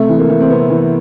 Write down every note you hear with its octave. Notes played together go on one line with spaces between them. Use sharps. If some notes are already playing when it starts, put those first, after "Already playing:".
Already playing: C3 A3
E3
A#3
E3
C4
C3 B3
E3